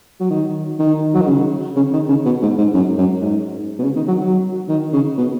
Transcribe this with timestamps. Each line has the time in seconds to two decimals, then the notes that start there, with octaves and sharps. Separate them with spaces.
0.20 F#3
0.30 D#3
0.79 D#3
1.14 F#3
1.21 D#3
1.27 C#3
1.76 C#3
1.93 D#3
2.08 C#3
2.25 B2
2.42 G#2
2.58 G#2
2.73 F#2
2.98 F#2
3.22 G#2
3.79 B2
3.84 C#3
3.96 D#3
4.07 F#3
4.20 F#3
4.68 D#3
4.92 C#3
5.18 B2